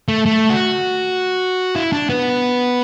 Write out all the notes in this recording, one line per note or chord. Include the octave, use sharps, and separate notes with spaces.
A3
A3
F#4
E4
D4
B3